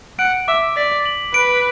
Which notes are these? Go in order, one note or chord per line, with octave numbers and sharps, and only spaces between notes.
F#5 D7
E5 D6
D5 B6
F#7
B4 D7